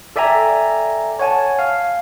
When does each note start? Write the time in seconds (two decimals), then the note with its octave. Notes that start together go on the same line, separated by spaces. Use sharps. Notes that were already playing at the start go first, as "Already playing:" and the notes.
0.16 A4 D5 E5 G5 G#5 A#5
1.19 C#5 F#5 G#5 A5
1.59 F5